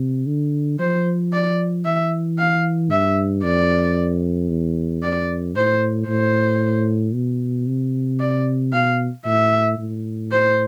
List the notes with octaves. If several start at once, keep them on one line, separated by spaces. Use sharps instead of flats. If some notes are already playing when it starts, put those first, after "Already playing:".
Already playing: C3
D3
F3 C5
D5
E3 E5
F5
G2 E5
F2 D5
E2
F2 D5
A2 C5
A2 C5
B2
C3
D5
B2 F5
A2 E5
A2
C5